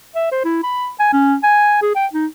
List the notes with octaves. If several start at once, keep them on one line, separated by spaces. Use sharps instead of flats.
E5
C5
E4
B5
G#5
C#4
G#5
G#4
G5
D#4